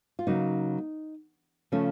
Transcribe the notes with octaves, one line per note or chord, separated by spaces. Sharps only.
F4
C#3 F#3 A#3 D#4
C#3 F3 A3 C#4